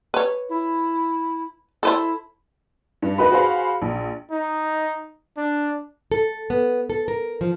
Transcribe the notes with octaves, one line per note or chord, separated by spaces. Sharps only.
B4 C#5
E4
E4 A4 B4 C5
G2
D#4 F#4 A#4 B4 B5
F#4 G#4 C5 F5 B5
A#1
D#4
D4
A4
B3
A4
A#4
F3